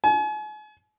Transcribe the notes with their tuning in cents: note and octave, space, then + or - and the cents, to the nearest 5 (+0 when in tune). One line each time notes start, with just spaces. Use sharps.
G#5 +40